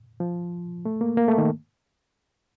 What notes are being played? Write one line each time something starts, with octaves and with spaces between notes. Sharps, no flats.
F3
A3
A#3
A#3
A3
D#3